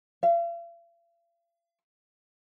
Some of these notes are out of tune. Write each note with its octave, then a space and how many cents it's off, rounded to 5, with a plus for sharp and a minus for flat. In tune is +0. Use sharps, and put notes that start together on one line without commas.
F5 -45